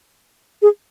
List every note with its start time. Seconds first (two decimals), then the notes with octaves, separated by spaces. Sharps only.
0.62 G#4